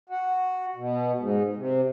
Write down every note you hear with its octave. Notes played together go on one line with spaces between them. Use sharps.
F#4
B2
G#2
C3